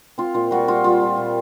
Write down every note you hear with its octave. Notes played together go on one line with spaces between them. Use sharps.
C4 F4
A#2 F4
G3 F#4
G3 F4
G3 F4
G3
A#2